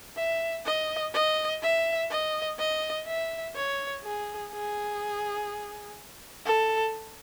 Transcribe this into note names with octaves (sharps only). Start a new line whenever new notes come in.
E5
D#5
D#5
E5
D#5
D#5
E5
C#5
G#4
G#4
A4